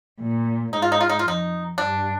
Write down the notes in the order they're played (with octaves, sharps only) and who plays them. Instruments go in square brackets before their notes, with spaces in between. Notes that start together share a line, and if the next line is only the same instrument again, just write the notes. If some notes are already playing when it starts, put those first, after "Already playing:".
[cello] A#2
[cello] G#2 [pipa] D#4
[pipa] F4
D#4
F4
D#4
F4
[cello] F2 [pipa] D#4
[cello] G2 [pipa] D4